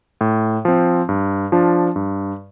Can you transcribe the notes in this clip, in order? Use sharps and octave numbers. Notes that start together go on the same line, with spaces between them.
A2
F3 C4
G2
F3 D4 F4
G2